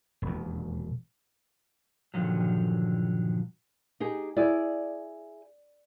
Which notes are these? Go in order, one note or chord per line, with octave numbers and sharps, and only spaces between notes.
E1 D#2
G2 A#2 D3 D#3 F3 F#3
D#4 G4 G#4
E4 G#4 D5